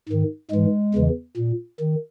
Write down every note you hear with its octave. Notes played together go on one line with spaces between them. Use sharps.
G#2 D#3
G#2 E3 G#3
E2 C#3 E3
A#2
D#3